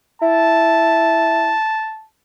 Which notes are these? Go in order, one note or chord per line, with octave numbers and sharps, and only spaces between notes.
E4 A5